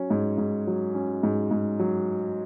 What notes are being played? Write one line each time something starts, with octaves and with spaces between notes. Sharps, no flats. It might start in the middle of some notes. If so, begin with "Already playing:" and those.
Already playing: F#3 C#4
G#2
G#2
F#3
C#4
G#2
G#2
F#3